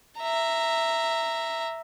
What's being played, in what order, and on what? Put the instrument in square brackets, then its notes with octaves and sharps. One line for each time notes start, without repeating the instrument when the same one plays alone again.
[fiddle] E5 A#5